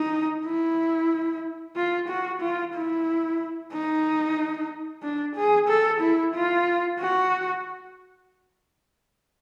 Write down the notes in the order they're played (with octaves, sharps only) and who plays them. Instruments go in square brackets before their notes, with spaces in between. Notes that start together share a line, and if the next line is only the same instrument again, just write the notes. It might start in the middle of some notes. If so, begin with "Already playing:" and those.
Already playing: [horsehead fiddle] D#4
E4
F4
F#4
F4
E4
D#4
D4
G#4
A4
E4
F4
F#4